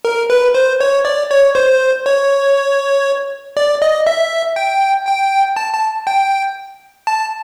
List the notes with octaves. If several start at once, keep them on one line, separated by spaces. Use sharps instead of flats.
A#4
B4
C5
C#5
D5
C#5
C5
C#5
D5
D#5
E5
G5
G5
A5
A5
G5
A5